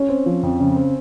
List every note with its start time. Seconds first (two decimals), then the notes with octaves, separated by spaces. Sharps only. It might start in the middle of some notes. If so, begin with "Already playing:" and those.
Already playing: C#4
0.09 C4
0.26 F3
0.43 F2
0.60 C#3
0.76 C4